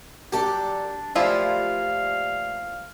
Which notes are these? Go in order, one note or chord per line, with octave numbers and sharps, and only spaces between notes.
F#3 D4 G4 A4 D5
A#2 F3 A3 E4 F4 G4 F5